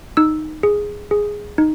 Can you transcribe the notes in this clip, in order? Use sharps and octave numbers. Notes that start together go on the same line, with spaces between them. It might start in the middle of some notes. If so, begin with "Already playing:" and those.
D#4 E6
G#4
G#4
D#4